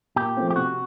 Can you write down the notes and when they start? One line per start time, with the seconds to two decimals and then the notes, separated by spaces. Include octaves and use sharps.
0.16 A#2 G4
0.36 F3 A3 C4 F4
0.50 G4
0.56 C3 F#4